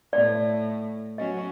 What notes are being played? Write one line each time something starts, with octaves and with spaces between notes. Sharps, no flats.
A2 D5
F#3 C#4 D#5